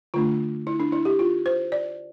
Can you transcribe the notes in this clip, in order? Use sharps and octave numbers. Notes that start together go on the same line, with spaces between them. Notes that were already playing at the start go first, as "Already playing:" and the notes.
D3 A3 D4 F4
E4
D4
E4
G4
F4
C5
D5